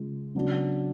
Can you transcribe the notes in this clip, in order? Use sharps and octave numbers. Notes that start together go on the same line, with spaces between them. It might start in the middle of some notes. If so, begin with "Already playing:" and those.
Already playing: C#3 G#3 F4
C#3 F#3 B3 D4